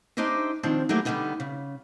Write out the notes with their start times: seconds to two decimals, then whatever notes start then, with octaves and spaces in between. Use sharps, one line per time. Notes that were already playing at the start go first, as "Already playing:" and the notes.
0.17 D4 D#4 G4 C5 D#5 E5
0.63 D#3 F3 C4 D4
0.89 F#3 A3 A#3 E4 G4 G#4
1.05 D3 D#3 G3 B3 D#4
1.40 C#3